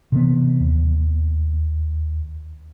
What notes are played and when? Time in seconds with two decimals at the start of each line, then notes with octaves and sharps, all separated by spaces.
0.12 C3 E3 B3
0.60 D#2